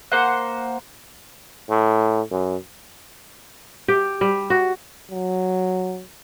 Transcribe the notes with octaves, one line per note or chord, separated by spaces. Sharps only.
A#3 C5 F#5
A2
F#2
G4
G3
F#4
F#3